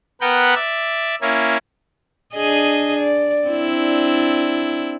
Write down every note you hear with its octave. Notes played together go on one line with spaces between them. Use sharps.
B3 A#4 B4 F#5 G5
D5 E5
A#3 C#4 E4
D4 G#4 D#5
D5
C4 D4 E4